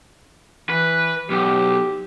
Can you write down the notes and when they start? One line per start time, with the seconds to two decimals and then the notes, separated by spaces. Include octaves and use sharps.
0.70 E3 B4
1.30 B1 G4